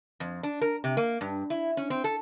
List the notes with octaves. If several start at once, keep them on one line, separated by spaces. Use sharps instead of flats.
F2
D4
A#4
C3
A#3
G2
E4
C#4
C4
A4